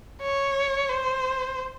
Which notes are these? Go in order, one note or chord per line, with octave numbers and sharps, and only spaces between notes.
C#5
C5